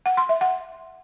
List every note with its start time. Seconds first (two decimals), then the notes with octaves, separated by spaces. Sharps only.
0.06 F#5
0.17 C6
0.29 E5
0.41 F#5